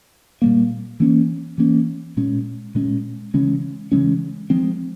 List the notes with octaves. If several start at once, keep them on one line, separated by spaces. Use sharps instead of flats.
A#2 G3 A#3
E3 A#3 C#4
E3 A#3 C#4
A#2 G#3 C#4
A#2 G#3 C#4
C#3 E3 G#3 C#4
C#3 E3 G#3 C#4
F3 G#3 C4